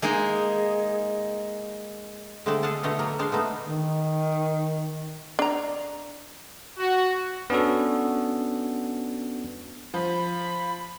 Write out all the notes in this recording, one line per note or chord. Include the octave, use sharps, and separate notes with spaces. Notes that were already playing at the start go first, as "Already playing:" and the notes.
G#3 A#3 D#4 G#4
D3 G#3 A3 C4 A4 D5
G#4 A4 F5 F#5 A5
B2 D3 A3 C#5 D#5
F#3 A#3
G#3 D4 C5 F5
A3 B3 D#4 A4
D#3
D4 A#5
F#4
B3 C#4 D4 F#4 A4
F3 B5